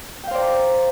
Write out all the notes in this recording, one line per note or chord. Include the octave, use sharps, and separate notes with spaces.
C5 D5 F5 G5 A#5